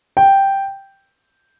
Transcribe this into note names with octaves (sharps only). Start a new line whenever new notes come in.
G5